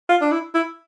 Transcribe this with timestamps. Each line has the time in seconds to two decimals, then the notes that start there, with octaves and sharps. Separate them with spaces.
0.09 F4
0.21 D4
0.32 E4
0.55 E4